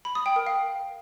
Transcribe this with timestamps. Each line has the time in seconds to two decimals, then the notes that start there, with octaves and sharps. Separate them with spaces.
0.05 B5
0.15 D#6
0.26 G5
0.36 A#4
0.46 F5